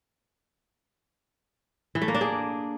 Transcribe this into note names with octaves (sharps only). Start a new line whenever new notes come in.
E3
A3
A#3
D4
G#4